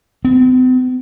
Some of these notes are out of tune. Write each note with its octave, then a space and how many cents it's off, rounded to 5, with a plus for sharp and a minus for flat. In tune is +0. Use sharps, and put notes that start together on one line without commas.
C4 -45